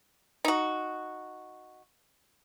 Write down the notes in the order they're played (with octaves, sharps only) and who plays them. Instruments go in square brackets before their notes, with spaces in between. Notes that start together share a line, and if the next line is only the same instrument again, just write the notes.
[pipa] D#4 F#4